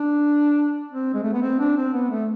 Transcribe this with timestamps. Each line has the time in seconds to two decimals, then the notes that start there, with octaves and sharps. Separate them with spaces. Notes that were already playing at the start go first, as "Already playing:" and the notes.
Already playing: D4
0.91 C4
1.14 G#3
1.23 A3
1.33 B3
1.42 C4
1.59 D4
1.77 C4
1.93 B3
2.10 A3